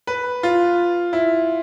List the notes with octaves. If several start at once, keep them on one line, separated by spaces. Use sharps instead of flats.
B4
F4
E4